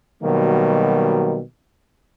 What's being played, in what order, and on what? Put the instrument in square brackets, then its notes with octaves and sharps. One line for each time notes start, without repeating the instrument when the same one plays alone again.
[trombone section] B2 D#3 F#3 G3 A#3